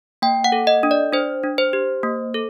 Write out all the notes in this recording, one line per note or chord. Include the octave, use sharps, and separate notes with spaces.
A#3 G5
F#5
A4
D#5
D4
D5
D4 C5
D4
C5
G4
A#3
A4